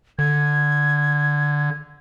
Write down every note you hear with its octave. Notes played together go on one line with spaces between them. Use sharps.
D3 G#6